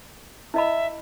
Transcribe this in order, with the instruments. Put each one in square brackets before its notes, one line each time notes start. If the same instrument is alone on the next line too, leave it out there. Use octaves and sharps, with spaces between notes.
[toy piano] E4 D#5 B5 [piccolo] E5